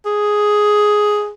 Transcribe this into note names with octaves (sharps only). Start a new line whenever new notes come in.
G#4